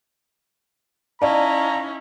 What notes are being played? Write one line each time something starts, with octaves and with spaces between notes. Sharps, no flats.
C#4 D#4 E4 D5 F5 A5 A#5